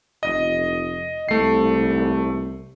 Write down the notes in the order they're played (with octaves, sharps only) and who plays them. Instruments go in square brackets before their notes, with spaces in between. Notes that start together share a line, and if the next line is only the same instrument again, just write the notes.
[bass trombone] F1 [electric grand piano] D#5
[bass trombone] C2 [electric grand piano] A3 C7